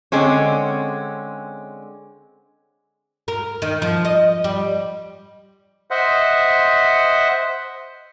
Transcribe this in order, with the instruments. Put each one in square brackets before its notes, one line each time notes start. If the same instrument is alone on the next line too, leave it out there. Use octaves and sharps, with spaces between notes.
[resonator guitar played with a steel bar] D3 G#3 C4 C#4
[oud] A#4
D#3
F3
D#5
G3
[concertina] C5 D#5 E5 F#5